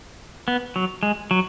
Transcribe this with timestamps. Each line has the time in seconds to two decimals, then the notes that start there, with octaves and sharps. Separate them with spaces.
0.48 B3
0.76 F#3
1.03 G#3
1.31 F#3